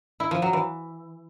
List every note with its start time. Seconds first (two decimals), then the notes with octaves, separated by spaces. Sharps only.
0.20 E4
0.31 F3
0.42 F#3
0.53 E3